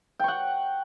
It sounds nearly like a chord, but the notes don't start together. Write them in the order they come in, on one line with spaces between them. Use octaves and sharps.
G5 C#6 F#5